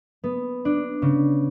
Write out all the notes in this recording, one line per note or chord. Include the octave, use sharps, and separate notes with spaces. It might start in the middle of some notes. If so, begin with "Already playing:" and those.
B3
D4
C#3